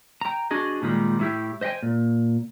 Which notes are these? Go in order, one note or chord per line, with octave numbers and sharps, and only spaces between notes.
G5 A#5
D4 F#4 G#4 D#5
A#2 D#3 G3 G#3
A2 E4 G4
C5 D#5 E5 G5 G#5
A#2